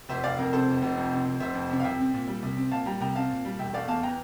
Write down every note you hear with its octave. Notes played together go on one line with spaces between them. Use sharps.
F1 C5 E5
F1 D5 F5
F2 A#4
C3 A4 C5
F1
F1
F2
C3
F1
F1 C5 E5
F2
C3
F5
C2 E5 G5
C4
A#2
G3
C2
C4
A#2 F5 A5
G3 G5 A#5
C2 G5 A#5
C4 F5 A5
A#2
G3
E1 E5 G5
A3 D5 F5
E2 F5 A5
E3 G5 A#5